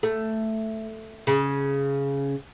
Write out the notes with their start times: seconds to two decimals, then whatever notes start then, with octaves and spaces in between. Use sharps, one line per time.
0.03 A3
1.27 C#3